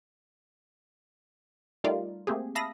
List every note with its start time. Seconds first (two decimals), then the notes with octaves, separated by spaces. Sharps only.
1.84 G3 A3 D#4 F4 A#4 D5
2.27 A3 A#3 C4 G4 G#4
2.55 E5 F5 A5 B5 D#6 A#6